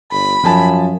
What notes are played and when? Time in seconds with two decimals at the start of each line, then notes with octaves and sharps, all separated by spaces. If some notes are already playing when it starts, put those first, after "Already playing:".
0.12 G1 B5
0.43 F#2 F3 G#5 A5